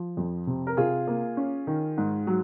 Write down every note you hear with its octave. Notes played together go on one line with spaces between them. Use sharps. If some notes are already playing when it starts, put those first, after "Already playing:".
Already playing: F3
F2
C3
A#4
C3 F4 G#4
A#3
C#4
D#3
G#2
F#3